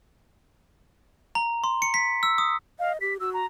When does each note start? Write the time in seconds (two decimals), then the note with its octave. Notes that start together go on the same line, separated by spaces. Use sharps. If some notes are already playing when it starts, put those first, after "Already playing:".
1.35 A#5
1.64 C6
1.82 C#7
1.94 B6
2.23 E6
2.38 D#6
2.80 D#5 F5
3.01 G4 B6
3.20 F#4 E6
3.34 A#5